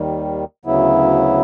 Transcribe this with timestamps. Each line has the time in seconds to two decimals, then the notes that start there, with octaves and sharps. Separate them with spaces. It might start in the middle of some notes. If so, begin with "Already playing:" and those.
Already playing: D#2 D#3 G3
0.65 D2 C#3 F#3 B3 E4